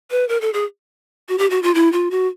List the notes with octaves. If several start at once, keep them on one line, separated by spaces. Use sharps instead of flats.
B4
A#4
A4
G#4
F#4
G4
F#4
F4
E4
F4
F#4